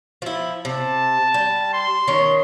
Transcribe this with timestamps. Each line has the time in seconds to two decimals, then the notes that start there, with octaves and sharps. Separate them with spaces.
0.22 F3 E4
0.65 C3 A5
1.34 G3
1.73 C6
2.08 D#3 C#4 C#5